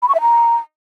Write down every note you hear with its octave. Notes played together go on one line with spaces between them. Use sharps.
B5
C#6
E5
A#5